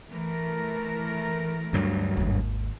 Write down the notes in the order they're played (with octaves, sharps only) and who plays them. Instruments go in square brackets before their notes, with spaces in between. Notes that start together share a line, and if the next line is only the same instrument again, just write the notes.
[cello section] E3 A3 A#4
[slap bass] D2 G2 F#3
[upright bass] G#1 D#2